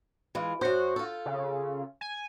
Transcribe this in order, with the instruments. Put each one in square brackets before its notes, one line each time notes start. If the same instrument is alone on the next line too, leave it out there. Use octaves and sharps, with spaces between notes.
[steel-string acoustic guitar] E3 G#3 F4
[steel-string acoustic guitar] F#2 C5 [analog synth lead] F#4
[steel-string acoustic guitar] F4 A4
[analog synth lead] C#3
G#5